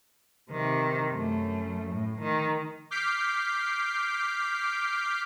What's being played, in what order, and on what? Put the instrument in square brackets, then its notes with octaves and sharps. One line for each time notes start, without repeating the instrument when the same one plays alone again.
[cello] C3 D#3
F#2 A3
A2
D#3
[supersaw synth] D6 F6 G6 B6 C7 D7